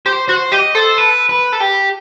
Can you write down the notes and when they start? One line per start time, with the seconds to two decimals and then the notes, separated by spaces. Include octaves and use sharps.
0.05 G4 C5
0.28 F#4 C5
0.52 G4 D#5
0.75 A4 C5
0.98 B4
1.29 B4
1.52 A4
1.60 G4